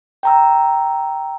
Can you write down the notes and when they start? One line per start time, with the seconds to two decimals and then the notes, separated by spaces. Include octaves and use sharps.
0.23 G5 A#5 E6